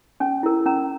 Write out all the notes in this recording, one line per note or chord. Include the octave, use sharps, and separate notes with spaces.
C#4 G#5
E4 A#4
C#4 A#5